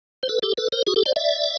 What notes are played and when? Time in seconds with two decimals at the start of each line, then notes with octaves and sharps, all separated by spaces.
0.23 C5
0.29 A4 B4
0.42 G4 A4
0.57 A4 B4
0.72 A#4 C5
0.87 F#4 G#4
0.96 G4 A4
1.06 C5 D5
1.16 D5 E5